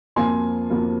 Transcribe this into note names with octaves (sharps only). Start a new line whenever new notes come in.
F2 F3 A#3 F4 G#5 C6
F2 F3 A#3 F4